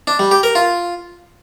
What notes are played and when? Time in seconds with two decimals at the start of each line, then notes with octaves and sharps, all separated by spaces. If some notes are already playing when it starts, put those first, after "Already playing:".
0.07 D4
0.19 G3
0.31 G4
0.43 A#4
0.55 F4